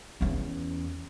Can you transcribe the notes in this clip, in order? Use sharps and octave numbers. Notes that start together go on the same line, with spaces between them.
E2 C#4